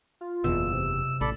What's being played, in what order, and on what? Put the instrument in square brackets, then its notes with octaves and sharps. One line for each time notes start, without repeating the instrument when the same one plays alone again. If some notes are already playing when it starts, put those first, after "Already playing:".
[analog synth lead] F4
[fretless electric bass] F#1 E2 B2 [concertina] E6
[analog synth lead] C3
[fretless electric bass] A1 [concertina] A4 D5 B5